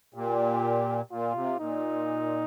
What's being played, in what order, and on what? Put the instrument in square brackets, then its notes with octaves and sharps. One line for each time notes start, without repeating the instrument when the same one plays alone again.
[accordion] A#2 [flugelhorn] G4
[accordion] A#2 [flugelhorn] F4
[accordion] C3
[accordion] A#2 [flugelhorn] D#4